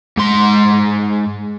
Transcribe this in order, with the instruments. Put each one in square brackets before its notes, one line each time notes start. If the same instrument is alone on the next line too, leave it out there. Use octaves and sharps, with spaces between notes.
[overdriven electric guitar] G#2 C6